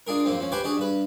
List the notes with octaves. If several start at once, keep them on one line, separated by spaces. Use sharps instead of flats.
D4 F4 G#4 A#4
F#2 F3 A#3 C4
F3 C#4
G4 B4 C5 G#5 D6
D4 F#4 G#4
G2 B4